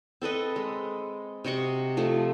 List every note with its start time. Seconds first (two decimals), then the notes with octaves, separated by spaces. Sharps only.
0.22 C4 A4 B4 D#5
0.56 G#3
1.44 C3 F#4 D#5 C#6
1.97 F3 A3